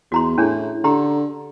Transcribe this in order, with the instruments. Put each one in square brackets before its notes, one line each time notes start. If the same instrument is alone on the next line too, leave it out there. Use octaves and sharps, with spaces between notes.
[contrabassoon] E2 [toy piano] F#4 A#5 C6
[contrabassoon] A2 [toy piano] C#4 D4 G#4
[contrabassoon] D3 [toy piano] G4 A#5 C6